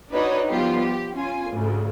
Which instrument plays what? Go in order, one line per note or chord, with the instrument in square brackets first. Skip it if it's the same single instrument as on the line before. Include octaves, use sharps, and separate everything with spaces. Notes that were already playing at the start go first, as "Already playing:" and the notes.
[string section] D4 D#4 F#4 B4 C#5 D#5
F3 G3 B3 F4 G4
G4
C#4 F4 G#5
D2 G#2 C#3